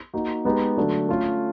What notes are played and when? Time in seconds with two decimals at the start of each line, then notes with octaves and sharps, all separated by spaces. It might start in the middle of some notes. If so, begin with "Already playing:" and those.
0.13 A#3 D#4 F#4
0.45 G#3 B3 D#4 G4
0.77 D3 F#3 A3 D4
1.09 A3 C#4 F4 A4